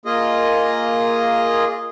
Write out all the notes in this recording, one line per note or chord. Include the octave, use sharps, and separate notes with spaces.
A#3 F4 G#4 D#5